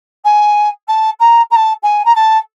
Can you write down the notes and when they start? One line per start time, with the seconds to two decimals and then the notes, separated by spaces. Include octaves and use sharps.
0.24 G#5
0.88 A5
1.19 A#5
1.51 A#5
1.55 A5
1.83 G#5
2.05 A#5
2.15 A5